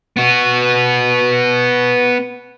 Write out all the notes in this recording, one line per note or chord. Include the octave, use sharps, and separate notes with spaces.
B3 F#4